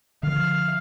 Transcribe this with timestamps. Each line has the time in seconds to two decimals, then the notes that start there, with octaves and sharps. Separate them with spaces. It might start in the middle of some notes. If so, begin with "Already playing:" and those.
0.23 D3 F3 F5